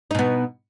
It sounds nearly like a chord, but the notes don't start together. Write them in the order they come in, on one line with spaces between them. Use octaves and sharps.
D#4 B2 B3